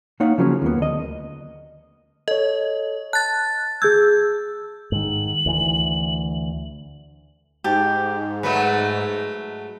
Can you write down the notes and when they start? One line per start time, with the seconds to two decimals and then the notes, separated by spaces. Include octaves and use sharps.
0.20 A#3 D#4 C#5 F5 F#5
0.38 C#3 F3 F#3 A#3 C4 C#4
0.62 D#2 A#3 B3
0.79 D2 D#5
2.28 A4 C#5 D#5
3.13 A5 F#6 A6
3.82 G#4 E6 G6 G#6
4.92 G#2 D#3 F#7
5.46 D2 E3
7.64 G#2 G4 A5
8.43 F#3 G#3 A3 B4 F#5